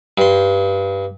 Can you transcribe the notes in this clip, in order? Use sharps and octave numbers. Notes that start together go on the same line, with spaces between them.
G2 C6